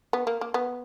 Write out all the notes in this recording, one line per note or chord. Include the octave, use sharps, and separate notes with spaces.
B3
A#3
A#3
B3